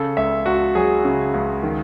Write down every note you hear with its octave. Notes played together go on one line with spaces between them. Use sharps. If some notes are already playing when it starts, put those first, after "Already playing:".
Already playing: C#3 A4
C#2 E5
C#2 F#4
F#3 G#4
C#3
C#2
D#3